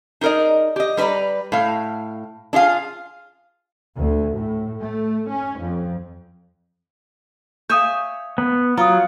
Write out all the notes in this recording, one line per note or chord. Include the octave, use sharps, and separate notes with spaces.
D#4 G#4 A#4 D5 D#5
G4 D#5
G3 A#4 B4 D5 A#5
A2 F5
D4 F4 G#4 F5
D2
A2
A3
C#4
F2
C#5 E5 F5 G#5 D#6 G6
B3
F#3 F4 A#5 D#6